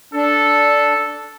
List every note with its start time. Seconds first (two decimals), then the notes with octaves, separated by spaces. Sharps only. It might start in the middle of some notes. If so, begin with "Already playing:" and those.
0.14 D4 A4